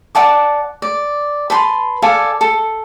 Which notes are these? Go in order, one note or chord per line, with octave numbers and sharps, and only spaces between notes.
D5 F#5 A5 D6
D5
B4 A5 C6
A4 D5 F5 G#5
A4